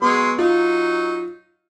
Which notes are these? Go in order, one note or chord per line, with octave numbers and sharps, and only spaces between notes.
F#3 G#3 B3 C6
F#3 D#4 F4